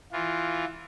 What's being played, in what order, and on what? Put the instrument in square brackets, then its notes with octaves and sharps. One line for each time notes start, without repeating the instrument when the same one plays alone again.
[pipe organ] E3 F4